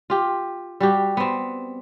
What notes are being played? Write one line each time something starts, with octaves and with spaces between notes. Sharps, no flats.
F4 G4
G3 F#4 G4
B3 C4